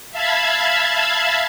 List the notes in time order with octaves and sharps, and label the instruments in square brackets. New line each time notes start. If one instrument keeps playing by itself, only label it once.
[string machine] E5 F5 A5 B5 G#6